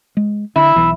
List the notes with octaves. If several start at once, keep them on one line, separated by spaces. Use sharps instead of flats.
G#3
D3 E4
B1 E3